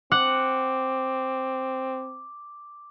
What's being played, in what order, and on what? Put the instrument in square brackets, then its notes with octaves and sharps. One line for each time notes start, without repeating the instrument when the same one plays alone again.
[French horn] C4 [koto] F#5 [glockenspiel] D6